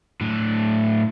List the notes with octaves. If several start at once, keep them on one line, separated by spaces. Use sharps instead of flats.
A2 D4